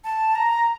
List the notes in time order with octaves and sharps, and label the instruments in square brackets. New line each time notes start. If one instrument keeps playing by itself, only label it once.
[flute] A5
A#5